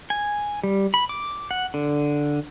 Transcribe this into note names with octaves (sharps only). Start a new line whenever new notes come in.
G#5
G3
B5
D6
F#5
D3